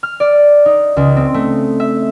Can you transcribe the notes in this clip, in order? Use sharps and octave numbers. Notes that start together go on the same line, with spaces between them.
F6
D5
D#4
C#2
C4
A3
E5